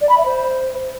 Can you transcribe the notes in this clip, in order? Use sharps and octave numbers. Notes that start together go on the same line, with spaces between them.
D5
B5
E5
C5